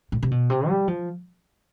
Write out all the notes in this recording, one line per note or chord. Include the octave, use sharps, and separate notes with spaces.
A2
C3
B2
C3
G3
F3